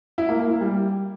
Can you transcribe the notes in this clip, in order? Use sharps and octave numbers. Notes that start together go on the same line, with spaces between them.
E4
A#3
A#3
E4
G3